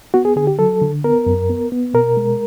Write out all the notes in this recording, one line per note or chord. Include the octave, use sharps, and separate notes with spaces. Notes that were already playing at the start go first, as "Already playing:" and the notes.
B3 F#4
G#4
D3 G#4
G4
F#3 A4
D3
B3 A#4
F#2
B3
B3
B2 A#4
G#3